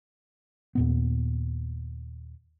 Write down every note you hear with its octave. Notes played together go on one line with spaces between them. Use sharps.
D#2 A#2 B3